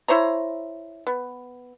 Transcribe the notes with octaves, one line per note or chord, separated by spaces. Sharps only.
E4 C5 C#5 A#5
B3